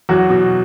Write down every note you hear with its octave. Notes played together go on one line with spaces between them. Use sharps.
E2 F#3 F#4
B2